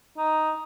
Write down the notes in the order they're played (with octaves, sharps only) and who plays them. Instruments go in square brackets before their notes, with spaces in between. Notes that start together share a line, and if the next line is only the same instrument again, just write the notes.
[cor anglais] D#4